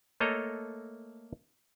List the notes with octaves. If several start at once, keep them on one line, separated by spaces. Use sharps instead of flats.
A3 A#3 A4 C#5 D#5 A#5